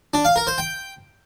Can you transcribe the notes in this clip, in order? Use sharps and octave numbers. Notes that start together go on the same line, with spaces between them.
D4
F5
A#4
C5
G5